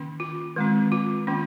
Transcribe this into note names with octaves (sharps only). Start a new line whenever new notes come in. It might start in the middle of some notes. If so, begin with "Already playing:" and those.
Already playing: D#3 A#3 C#4
F4
D#3 G#3 C4
F4
D#3 A#3 C#4